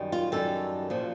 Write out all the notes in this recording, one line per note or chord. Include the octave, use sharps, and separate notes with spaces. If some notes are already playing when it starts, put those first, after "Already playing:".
Already playing: F#2 D#3 G3
F4
F#2 D#3 G3 A4
A#2 F3